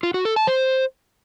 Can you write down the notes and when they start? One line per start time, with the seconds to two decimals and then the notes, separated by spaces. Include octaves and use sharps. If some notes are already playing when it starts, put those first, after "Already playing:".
0.03 F4
0.14 F#4
0.25 A4
0.36 A5
0.47 C5